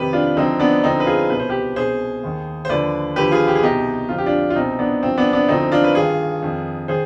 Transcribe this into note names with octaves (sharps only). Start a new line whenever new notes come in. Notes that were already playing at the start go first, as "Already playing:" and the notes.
Already playing: F2 C3 D#3 G4 B4
D4 F4
D2 D3 F3 C4 D#4
B3 D4
D2 D3 F3 C4 D#4
B4
F4 G#4
C2 B2 B4
C5
G4 B4
C2 B2 G#4 C5
D#2 D#3
C5
D#2 D3 F3 B4 D5
D#2 D3 F3 G4 B4
F4 G#4
G4
G#4
C2 B2 D#4 G4
F2 D3 F3 F4
G4
D4 F4
F4
C2 B2 C4 D#4
B3 D4
G2 F3 C4
B3 D4
B3 D4
D2 D3 F3 C4 D#4
D4 F4
B4
G2 D#3 F4 G#4
F2 D#3
D#3 G#4 C5